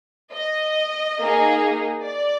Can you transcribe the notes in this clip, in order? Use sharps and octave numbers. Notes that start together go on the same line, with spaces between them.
D#5
A#3 D#4 G#4
D5